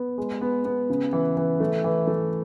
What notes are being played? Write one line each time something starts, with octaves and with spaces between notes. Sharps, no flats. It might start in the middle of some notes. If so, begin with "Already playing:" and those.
Already playing: B3
G#3
B3
B3
C#3
E3
E3
A3
E3
A3